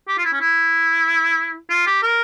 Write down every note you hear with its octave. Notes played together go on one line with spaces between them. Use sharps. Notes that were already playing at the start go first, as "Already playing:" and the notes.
G4
F4
E4
C#4
E4
F4
G4
A#4